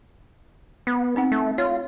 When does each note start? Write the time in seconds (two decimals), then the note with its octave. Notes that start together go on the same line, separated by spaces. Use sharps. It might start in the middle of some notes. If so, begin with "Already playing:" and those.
0.87 B3
1.16 C4 D#4 F#5
1.32 A3
1.58 F4 C#5